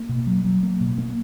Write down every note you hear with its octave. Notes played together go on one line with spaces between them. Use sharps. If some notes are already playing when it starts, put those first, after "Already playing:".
Already playing: A#3
B2
F#3
F#3
A#3
B2
A#3